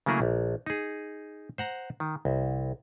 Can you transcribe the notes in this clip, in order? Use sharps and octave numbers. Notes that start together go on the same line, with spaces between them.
C#3 F#3 A3 A#3 E4 G#4
A#1
D#4 G#4
C5 F#5 A#5
D#3
C2